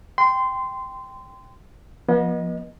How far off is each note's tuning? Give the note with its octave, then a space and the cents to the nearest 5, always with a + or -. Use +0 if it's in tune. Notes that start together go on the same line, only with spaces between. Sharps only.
G5 +0 C6 -20
F3 +0 B3 -40 D#5 +0